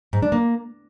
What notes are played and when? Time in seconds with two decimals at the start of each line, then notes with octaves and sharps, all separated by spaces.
0.13 G#2
0.23 D4
0.32 A#3